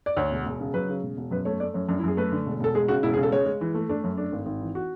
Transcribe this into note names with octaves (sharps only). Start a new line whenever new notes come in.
D5
D2 C#5
E1
E1
C#3
F#3 B4
C#3
E1
E1
F#2 B4
A3 C#5
A3 D5
F#2 C#5
F#2 D4
E4
F#2 G#4
A3 B4
D3
E1
E1 A4
G#3 G#4
C#3 F#4
E1 E4
G#4
C#3
A4
G#3 C#5
G#3
E3
A3
A3 D4
F#2 C#4
A3 D4
G#1
G#1
E3
F#4